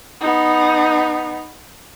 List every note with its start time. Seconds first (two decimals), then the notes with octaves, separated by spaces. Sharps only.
0.20 B3 D#4